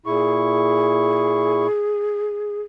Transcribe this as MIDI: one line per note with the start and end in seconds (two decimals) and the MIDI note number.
0.06 1.67 46
0.06 1.67 64
0.06 2.61 68
0.06 1.67 85